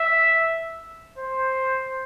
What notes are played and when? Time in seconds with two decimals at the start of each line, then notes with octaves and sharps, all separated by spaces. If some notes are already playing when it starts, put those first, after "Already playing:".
Already playing: E5
1.18 C5